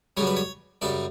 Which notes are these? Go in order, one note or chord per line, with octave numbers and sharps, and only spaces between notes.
F#2 C#3 G3 C#5
B4
C#5
F#2 C#3 G3 D5